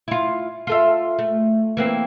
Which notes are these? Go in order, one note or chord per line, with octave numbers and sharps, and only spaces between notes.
E4 F4
F4 A4 E5
A3
E3 A#3 C4